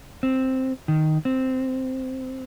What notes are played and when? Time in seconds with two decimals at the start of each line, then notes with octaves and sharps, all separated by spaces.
0.23 C4
0.88 D#3
1.25 C4